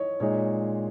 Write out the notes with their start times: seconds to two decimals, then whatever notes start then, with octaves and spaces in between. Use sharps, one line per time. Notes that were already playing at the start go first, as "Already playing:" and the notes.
Already playing: C#5 D#5
0.20 A#2 G#3 D#4 G#4 C#5